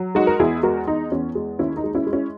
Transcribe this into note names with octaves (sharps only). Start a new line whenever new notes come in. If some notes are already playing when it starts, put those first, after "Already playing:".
Already playing: F#3
G#3 D#4 F#4
A#4
E2 E4 G#4
G#3 F#4 A#4
E2 D#4
E2 C#4
G#3
D#2 C#4 E4
D#4
G#3
C#4 E4
G#3
C#4 E4